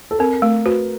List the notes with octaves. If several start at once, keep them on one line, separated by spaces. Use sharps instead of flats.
A4
C4 A#4
A3
F#4 B4